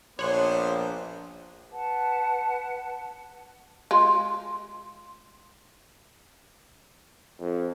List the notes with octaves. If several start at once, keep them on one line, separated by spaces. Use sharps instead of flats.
A#1 B3 D4 C5 C#5 F#6
B4 F#5 A5
G#3 F4
F2